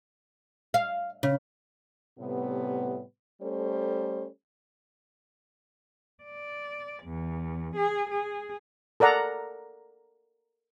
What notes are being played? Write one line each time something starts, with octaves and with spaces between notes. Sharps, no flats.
F5
C#3
A2 C3 G3 B3
G3 A3 C#4 A4 C5
D5
E2
G#4
G#4
A4 A#4 D5 F#5 A#5